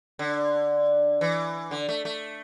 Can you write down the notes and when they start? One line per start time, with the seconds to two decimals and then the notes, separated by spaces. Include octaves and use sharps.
0.19 D3
1.21 E3
1.71 D3
1.89 A3
2.05 A3